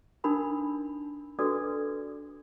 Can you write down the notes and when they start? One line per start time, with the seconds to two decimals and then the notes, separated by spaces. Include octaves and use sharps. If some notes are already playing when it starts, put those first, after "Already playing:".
0.24 D4 D#4 A#4 B5 D#6
1.39 D4 F#4 A4 B4 D5 D#6